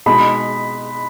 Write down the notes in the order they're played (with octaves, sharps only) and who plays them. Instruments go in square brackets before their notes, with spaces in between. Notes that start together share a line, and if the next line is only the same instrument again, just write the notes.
[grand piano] B2 G#3 D#4 [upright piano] B5